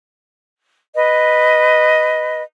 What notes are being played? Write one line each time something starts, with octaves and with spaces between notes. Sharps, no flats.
B4 D#5